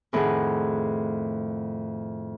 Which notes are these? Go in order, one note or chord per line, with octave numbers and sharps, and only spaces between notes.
F2 A2 D#3 A3 G#4 F#5